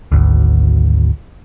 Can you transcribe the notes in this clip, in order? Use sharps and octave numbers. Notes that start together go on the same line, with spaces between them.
G#1 D2